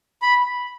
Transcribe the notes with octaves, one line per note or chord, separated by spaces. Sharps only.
B5